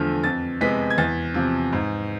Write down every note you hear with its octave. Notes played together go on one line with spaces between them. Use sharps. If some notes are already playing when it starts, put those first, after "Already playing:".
Already playing: E2 D3 F3 A3 F6
F2 A6
C3 G#3 B3 B6
G#6
E2 A6
C3 F3
G#2